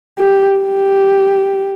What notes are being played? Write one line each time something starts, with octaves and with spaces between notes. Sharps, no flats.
G4
G4